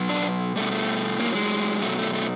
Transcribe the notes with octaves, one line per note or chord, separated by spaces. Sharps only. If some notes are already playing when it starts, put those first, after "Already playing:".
Already playing: B2 F#3
D4
B2 G3 A3
A3
A2 F#3 A#3
G#3
B2 F#3 A3
A3
A3